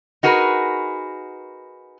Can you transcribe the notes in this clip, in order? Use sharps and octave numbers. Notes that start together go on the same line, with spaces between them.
D#4 F#4 G#4 A#4 B4